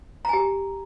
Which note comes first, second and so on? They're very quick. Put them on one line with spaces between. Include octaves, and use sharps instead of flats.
A#5 G#5 G4